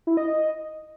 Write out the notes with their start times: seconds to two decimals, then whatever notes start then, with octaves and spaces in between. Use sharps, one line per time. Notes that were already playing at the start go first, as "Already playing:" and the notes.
0.07 E4
0.17 D#5
0.27 D#5